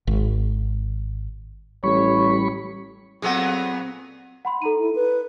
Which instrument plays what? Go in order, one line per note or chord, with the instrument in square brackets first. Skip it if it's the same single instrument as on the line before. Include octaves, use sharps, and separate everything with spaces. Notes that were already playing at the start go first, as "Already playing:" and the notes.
[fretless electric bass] G#1
[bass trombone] A1 [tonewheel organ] G3 B5 C#6 [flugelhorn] C#5
[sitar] A#2 F#3 B3 [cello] C4 [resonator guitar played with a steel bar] G#4 A4 F#5
[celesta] F#5 B5 C6
[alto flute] D#4 [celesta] A4 A#5 D#7
[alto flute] E4
B4